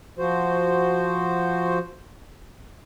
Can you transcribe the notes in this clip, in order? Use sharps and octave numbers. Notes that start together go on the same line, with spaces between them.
F3 F#4 C5